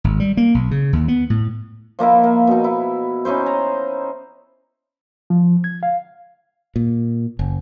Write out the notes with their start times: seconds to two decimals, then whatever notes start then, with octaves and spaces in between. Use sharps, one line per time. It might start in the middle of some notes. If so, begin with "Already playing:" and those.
0.04 G#1
0.20 G3
0.37 A#3
0.54 B1
0.71 C#3
0.93 D#2
1.08 B3
1.30 A2
1.99 F3 A#3 D#4 E4
2.23 A#3
2.47 B2 D#4
2.64 E4
3.25 C#4 D#4 E4 C5
3.46 A#5
5.30 F3
5.64 G#6
5.83 F5
6.76 A#2
7.39 F#1